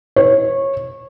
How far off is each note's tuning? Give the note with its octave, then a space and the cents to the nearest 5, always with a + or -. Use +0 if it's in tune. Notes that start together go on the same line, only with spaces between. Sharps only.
C#5 -20